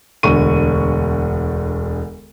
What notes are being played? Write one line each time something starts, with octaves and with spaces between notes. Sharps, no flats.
E1 D2 C#6 D#7